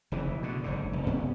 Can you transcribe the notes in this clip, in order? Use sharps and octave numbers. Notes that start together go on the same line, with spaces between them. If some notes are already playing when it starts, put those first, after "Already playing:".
F1 C#3 E3
B2 D3
F#1 G#2 D3
F1
G2 C3 B3 C#4